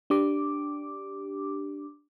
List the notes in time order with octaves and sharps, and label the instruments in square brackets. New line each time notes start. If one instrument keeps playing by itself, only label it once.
[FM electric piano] D4 G4 D6